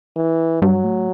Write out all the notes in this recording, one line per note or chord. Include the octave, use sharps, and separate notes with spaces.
E3
G2 F#3
A2